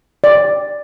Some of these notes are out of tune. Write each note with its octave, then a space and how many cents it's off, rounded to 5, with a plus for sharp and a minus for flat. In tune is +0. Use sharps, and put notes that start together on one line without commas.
D5 +5